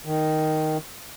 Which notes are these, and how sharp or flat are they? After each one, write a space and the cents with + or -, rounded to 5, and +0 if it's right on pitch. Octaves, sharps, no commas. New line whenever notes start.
D#3 +0